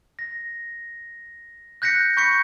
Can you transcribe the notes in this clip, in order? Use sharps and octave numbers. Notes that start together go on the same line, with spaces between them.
A#6
F#6 G6 A#6 B6 C#7
B5 C#6 G6 B6 C#7